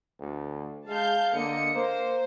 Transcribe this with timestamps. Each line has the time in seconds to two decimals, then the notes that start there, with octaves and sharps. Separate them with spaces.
0.19 D2
0.87 G#3 F5 A5 G6
1.33 D3 A#3 D#5 C#7
1.75 A#3 C5